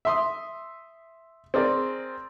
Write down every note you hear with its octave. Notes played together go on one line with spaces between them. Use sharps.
E5 C6 D#6
C4 G#4 A#4 D5